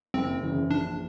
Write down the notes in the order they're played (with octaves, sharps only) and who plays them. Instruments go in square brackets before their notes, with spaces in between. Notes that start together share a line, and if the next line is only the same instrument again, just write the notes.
[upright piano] F#1 [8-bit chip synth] C4
[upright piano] E2 C#3 E3
[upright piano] A#1 [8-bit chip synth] D4